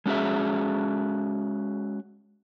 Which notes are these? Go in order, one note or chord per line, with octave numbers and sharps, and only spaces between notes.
G#3 C#4 F#4 G#4 E5